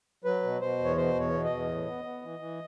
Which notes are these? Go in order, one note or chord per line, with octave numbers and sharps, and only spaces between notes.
F#3 B4
B2
B2 C5
E2
C#5
B2 C5
E2
C#5
B2
D#5
E2
A2
B3
B3
E3
E3